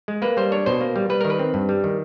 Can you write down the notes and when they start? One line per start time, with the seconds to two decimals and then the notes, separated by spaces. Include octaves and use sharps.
0.08 G#3
0.22 A#3 B4
0.37 G3 C5
0.52 D4 C#5
0.66 B2 C5
0.81 A#3
0.96 G3
1.10 G3 B4
1.21 D#3 A#4
1.30 B4
1.39 C4
1.54 G2
1.69 G3
1.84 D#3